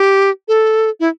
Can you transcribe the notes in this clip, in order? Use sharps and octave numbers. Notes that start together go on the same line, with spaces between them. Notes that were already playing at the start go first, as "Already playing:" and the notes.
Already playing: G4
A4
E4